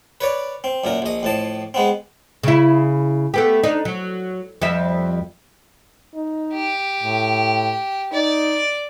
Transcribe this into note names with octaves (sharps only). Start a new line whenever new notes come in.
B4 C#5 D5
C4
F#2 A#2 A#4
A#1 D#5
F2 A2 A5
G#3 B3 C4
C#3 E4
A3 B3 G4
D4 D#4
F#3
F2 G3 E5
D#4
G4
A2
D#4 D5